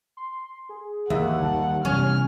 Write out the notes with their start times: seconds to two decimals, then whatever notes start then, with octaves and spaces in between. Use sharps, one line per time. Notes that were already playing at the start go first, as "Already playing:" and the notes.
0.17 C6
0.69 G#4
1.10 D#2 E3 E5 F#5
1.42 D#3 G3 A5
1.85 C3 E3 G3 B3 C#4 F6